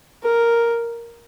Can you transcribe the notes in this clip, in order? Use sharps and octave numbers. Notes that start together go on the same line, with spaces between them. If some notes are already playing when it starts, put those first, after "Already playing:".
A#4